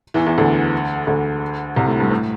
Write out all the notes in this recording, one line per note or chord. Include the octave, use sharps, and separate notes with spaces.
E2 E3
E2 E3
D2 D3
D2 D3
C2 C3
A2
G2
A2